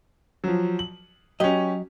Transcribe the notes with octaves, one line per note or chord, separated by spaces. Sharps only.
F3 F#3
F#7
F#3 C#4 G4 D#5